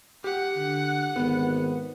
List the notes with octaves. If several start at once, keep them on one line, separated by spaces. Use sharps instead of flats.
G4 F#5
D3
G#1 B3